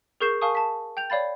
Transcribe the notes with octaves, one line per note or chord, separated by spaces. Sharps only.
G#4 A#4 C#6 G6 C7 E7
A#4 F5 G#5 A5 C#6 D#6
A5 B6
G5 G6 F7
C#5 D5 F5 B5 A6